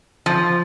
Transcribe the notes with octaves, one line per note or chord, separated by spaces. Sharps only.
F3